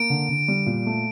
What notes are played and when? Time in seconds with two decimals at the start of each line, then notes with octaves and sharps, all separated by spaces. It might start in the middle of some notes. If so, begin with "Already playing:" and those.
Already playing: A#3 D7
0.10 D3
0.29 D3
0.48 G3
0.66 A#2
0.86 A3